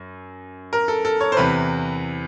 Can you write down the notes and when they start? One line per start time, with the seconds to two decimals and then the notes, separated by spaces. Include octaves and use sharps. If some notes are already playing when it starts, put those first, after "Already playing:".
Already playing: F#2
0.73 A#4
0.88 A4
1.05 A4
1.21 C#5
1.32 C5
1.37 E2 C3 E3 B4